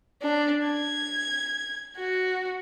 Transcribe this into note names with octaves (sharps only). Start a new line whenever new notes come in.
D4
G#6
F#4